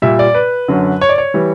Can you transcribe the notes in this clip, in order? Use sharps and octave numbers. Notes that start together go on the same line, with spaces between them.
A#2 G3 E5
D5
B4
F#2 D3 F#3
C#5
D5
C#5
E3 G3